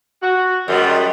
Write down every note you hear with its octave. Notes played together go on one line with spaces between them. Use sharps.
F#4
F#2 G3 G#3 B3